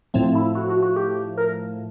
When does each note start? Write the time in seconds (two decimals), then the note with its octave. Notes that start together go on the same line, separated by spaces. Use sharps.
0.14 A2 F3 A3 C4
0.35 E4
0.55 F#4
0.70 F#4
0.83 F#4
0.96 G4
1.38 A#4